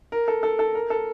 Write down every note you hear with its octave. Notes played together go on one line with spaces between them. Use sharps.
A#4
A4
A4
A4
A#4
A4